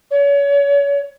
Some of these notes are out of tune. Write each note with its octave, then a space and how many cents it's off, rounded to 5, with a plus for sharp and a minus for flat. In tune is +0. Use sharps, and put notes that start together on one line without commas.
C#5 +35